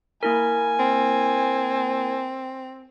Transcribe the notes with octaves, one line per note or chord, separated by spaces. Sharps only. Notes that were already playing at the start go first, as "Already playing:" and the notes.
A#3 E4 A#4 G#5
C4